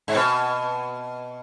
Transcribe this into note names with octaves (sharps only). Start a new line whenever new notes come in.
G#2
B2